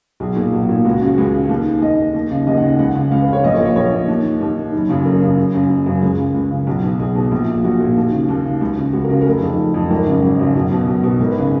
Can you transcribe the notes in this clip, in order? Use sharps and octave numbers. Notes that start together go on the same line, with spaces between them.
B1 G#4
A#2
B1
A#2
C#2 F#4
C#3 F#4
C#2 G#4
C#3
D#2
D#3
D#2 D#5
D#3
D#2
C#3
D#2 D#5
F#5
C#3
F#5
C#2 F#5
C#3
C#2 F5
B4
C#3
C#5
A#1 D#5
C#5
A#2
C#5
A#1 C#5
A#2
D#2
D#3
D#2
D#3
F#1
F#2 C#3
F#1 A#4
F#2 C#3
F#1
F#2 C#3
F#1
F#2 C#3
C#2 G#4
C#3
C#2
C#3
B1
B2
B1 G#4
B2
A#1
A#2
A#1 F#4
A#2
D#2
C#3
D#2
C#3
C#2
C#3
C#2 F#4
A#4
C#3
F#4
A#4
F1 G#4
F2 D#3
F1
F2 D#3
G#1 A#4
F#2 C#3
G#1
F#2 C#3
B1
B2
B1
B2
G#1 A#4
B4
C#3 G#4